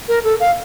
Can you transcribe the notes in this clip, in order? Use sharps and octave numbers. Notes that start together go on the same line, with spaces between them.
A#4
A4
F5